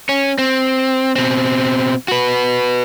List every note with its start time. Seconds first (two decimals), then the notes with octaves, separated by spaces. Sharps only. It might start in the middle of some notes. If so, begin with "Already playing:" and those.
0.09 C#4
0.38 C4
1.16 B2 C4
2.08 F#4 B4